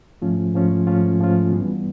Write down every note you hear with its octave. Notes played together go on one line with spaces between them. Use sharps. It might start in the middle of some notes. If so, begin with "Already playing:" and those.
G#2 F3 A3 C#4 F4
G#2 F3 A3 C#4 F4
G#2 F3 A3 C#4 F4
G#2 F3 A3 C#4 F4
G2 E3 G3 B3